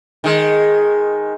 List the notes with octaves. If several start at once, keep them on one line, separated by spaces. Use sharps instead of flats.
D#3 G#3